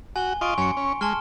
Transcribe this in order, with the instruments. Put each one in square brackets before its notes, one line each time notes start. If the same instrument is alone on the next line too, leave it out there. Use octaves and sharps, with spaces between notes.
[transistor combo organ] F#4 [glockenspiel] G#5 G7
[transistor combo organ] F4 D#5 [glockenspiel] C6 C#6 D7
[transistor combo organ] F#2 C#4 [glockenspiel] G#5 C#7
[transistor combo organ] C#4
[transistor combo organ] G#3 [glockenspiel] A5 C6 F6